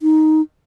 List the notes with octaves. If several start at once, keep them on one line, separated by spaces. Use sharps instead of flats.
D#4